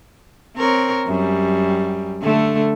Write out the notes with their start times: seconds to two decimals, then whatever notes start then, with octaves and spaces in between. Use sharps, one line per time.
0.56 C4 A#4 C#5
1.07 F#2 G3
2.21 D3 A3